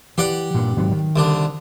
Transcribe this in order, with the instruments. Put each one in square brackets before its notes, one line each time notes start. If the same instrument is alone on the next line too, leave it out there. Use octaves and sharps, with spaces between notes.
[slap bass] E3 [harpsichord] G4 D5 F#5
[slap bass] G2 A#2
G#2 D#3 F#3
D#3
[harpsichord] C2 D3 D4